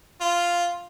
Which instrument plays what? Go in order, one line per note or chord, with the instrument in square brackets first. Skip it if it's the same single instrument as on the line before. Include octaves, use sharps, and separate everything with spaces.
[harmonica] F4